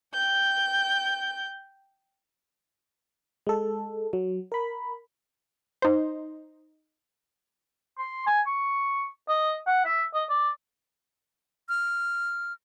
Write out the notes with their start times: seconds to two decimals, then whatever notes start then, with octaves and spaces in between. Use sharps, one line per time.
0.13 G5 G6
3.47 G#3 A4
4.13 F#3
4.52 A#4 B5
5.82 D#4 C5
7.98 C6
8.27 G#5
8.46 C#6
9.28 D#5
9.67 F#5
9.85 E5
10.14 D#5
10.30 D5
11.69 F6